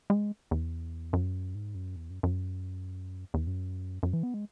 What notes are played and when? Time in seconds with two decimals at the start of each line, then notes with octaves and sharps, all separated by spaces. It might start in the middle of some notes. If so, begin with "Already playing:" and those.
0.10 G#3
0.51 E2
1.13 F#2
1.55 G#2
1.75 F#2
1.96 E2
2.10 F#2
2.23 F#2
3.34 E2
3.47 F#2
4.03 F#2
4.13 E3
4.23 B3
4.34 G#3